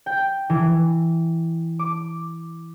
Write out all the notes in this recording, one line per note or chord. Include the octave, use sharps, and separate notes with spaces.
G5
E3
D6